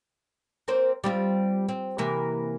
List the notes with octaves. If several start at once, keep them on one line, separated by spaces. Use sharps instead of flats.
A#3 C4 C5
G3 C4 F4
C4
C3 E3 A#3